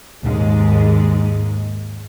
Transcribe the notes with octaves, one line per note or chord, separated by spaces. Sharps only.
D#2 G#2 G#3